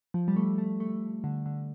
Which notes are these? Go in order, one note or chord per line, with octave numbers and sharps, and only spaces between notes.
F3
G3
A3
A3
A3
D3
D3